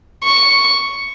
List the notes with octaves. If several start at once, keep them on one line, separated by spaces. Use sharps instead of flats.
C#6